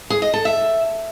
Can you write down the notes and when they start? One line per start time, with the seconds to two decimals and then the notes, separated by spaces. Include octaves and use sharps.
0.10 G#4
0.22 D#5
0.34 A4
0.45 E5